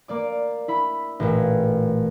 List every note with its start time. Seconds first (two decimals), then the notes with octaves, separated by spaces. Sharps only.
0.08 A#3 D5 D6
0.68 E4 B5
1.20 A1 A#2